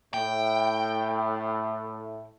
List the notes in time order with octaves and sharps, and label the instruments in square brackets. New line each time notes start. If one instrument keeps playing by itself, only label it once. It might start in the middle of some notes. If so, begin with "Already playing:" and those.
[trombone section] A2 [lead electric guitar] G5